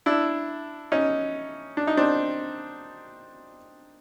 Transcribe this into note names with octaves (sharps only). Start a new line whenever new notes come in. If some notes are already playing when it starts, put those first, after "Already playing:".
D4 E4
C#4 D#4
D4
D#4
C4 D4